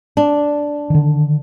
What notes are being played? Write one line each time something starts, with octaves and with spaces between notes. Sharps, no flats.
D4
D3 D#3